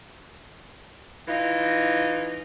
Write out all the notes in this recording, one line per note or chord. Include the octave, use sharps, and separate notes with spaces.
E3 D#4 F4